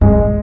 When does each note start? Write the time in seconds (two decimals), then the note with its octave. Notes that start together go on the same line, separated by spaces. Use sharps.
0.01 G2 G#3
0.11 A#2